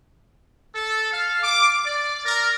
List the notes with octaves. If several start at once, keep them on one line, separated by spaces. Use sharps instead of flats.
A4
F5
D6
D5
A#4